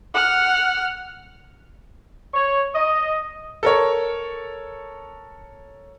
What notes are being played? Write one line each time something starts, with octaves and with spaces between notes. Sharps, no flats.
F#5 F6
C#5
D#5
A4 A#4 C#5